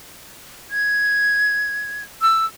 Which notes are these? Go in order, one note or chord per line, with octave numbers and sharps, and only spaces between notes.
G#6
E6